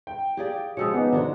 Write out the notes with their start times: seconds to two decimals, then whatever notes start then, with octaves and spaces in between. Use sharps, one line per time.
0.07 G5
0.37 E4 G4 G#4 D5 F5
0.77 C#3 F3 G#3 F#4 D#6 E6 C#7
0.94 B3 D#4 F#5 G#5 D6
1.13 D3 D4 F4 F#4 C5 D#5